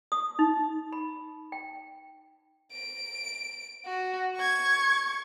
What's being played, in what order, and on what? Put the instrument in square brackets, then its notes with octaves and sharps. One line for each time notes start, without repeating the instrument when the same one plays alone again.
[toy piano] D#6
D#4
B5
G5
[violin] D7
F#4
C#6 G#6